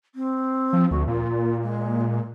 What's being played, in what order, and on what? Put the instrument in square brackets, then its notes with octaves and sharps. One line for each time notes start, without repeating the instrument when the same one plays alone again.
[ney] C4
[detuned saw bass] F3
[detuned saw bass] D2 [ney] F#4
[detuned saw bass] A#2 [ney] F4
[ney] G#3